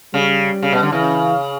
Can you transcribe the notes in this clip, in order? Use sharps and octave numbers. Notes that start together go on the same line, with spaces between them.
C#3 G3
C#3
B2
D3
C#3 E3